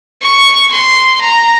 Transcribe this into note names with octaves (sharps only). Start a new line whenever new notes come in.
C#6
C6
A#5